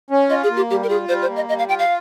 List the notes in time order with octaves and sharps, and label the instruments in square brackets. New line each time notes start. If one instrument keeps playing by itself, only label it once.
[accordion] C#4
[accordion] F4 [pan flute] D#5
[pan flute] G#4
[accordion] A#3
[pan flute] G4
[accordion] G3 [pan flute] G4
[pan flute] A#4
[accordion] F4 [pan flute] G#4
[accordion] G3 [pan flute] C5
[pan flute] C5
[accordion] A#3
[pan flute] D#5
[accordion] G3 [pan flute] D#5
[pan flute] F5
[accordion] F4 [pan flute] G5
[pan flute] F5